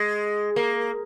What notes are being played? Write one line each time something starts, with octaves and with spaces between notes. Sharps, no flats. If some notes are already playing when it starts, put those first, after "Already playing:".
Already playing: G#3
A#3